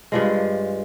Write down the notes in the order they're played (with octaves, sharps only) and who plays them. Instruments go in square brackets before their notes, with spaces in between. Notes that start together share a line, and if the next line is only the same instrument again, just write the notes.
[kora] G2 F3 G#3